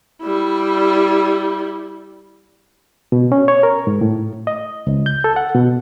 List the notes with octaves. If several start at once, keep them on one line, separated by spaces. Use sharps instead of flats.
G3 E4
B2
C#4
C#5
A#4
G#2
A2
D#5
C#2
G6
A4
F#5
B2